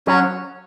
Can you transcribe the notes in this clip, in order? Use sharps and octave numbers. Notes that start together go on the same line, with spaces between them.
F#3 C#4